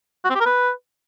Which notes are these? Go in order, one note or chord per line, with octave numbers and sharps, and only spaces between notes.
F#4
C4
G4
A#4
B4